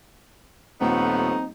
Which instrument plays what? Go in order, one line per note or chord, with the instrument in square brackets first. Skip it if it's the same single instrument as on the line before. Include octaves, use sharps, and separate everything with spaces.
[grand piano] D#1 [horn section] F3 A3 B3 [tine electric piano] C4 [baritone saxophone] D#4